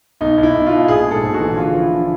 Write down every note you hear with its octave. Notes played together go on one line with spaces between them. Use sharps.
B1 D#4
B1
E4
B1
B2 F4
A#1 G#4
G#2
A4
A#1
F#4
E3
D3 F4
F3
E4
D3